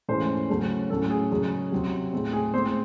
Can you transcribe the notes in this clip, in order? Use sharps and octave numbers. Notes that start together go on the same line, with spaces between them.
G#2 E3 A3 C#4 C5
C#3 F#3 A3 C#4
A2 F#3 C#4 A4
G#4
F#2 C#3 G#3 C#4
C3 F#3 C4
A2 G#3 C4
G#4
A2 G#3 C4 C5